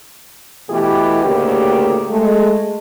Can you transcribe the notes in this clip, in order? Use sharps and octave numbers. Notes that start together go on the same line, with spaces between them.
B2 E3 A3 E4 G4
D2 A2 C#3 A#3 G4
G#3 A3